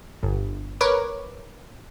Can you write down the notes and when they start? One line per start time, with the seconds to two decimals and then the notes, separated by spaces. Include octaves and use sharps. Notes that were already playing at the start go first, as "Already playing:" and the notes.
0.23 G1
0.81 A#4 B4 C#5 D6